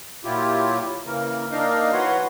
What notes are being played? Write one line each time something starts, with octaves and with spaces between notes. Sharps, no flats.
A#2 F#3 E4 F4 G4
C#3 E3 A#3 A#4
A#3 D4 D#4 A#4 D#5 F5
E3 F#4 B4 C#5 F#5 C6